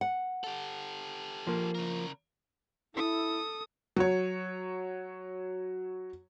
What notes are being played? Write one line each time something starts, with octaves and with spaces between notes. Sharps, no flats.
F#5
G4 A4
F3 A#3
C#3 A#4
E4 A4 D#6
F#3 C#5